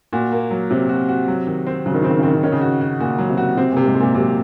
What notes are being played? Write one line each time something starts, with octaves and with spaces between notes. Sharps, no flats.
A#2 F#4
A#3
F#3
C3 F#3
F#4
F#4
F#3
D#3
C4
C#3 F#3
D#3
C#3 C4
D#3
C#3
D#3 C4
C#3
D#3 C#4
C#3
F#4
F#4
A#2 F#4
F#3
C3
F#4
C3 C4
A#2
C3
G#2
C3
A#2
C3 F#3